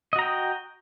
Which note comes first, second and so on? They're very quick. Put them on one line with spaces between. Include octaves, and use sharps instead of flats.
D#5 F#4 A#5 G5